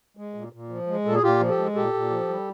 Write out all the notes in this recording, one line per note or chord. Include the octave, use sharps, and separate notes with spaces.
G#3
A#2
A#2
F3
G#3
A#2 A4
G#4
A#2 F4 G4
F3
G4 A4
G#3
A#2 G4 A4
A#2
F3
G3